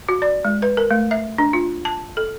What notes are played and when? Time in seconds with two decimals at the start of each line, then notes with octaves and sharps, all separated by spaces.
0.09 F#4
0.22 D5
0.45 G#3
0.62 B4
0.77 A#4
0.91 A3
1.11 E5
1.38 D4
1.53 F4
1.85 A5
2.17 A4